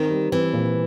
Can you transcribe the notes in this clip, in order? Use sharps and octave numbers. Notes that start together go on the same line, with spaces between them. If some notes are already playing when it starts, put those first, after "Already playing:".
Already playing: D#3 C4
G3
E3 C4
A#2